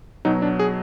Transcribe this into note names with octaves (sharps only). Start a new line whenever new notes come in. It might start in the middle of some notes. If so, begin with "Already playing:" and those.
B2 F#3 D#4
D4
G#4